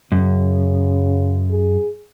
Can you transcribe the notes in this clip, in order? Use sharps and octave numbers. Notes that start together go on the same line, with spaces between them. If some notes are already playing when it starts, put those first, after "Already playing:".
F#2 C#3
G#4